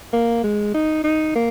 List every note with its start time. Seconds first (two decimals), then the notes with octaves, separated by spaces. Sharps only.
0.13 A#3
0.44 G#3
0.75 D#4
1.04 D#4
1.35 A#3